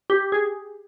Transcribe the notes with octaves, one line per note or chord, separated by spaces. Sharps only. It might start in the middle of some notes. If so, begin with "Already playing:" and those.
G4
G#4